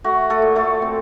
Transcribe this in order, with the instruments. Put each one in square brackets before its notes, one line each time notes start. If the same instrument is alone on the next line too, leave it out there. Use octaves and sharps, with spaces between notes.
[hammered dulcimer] A3 F#4
A3 A4
A#2
A3 A4
C4